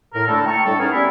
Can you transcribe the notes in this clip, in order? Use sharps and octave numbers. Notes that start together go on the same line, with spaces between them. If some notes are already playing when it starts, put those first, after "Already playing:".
A2 A#4
D3 A3 E4 A4
G5 A5 A#5 C#6
A2 G3 D4 A4
B3 C#4 D#4 G#4 A#4
G3 B3 C#4 E4